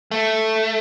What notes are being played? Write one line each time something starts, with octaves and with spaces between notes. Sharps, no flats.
A3